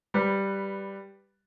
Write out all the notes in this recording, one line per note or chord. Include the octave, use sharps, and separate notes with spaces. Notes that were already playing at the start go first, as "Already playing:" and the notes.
G3 B4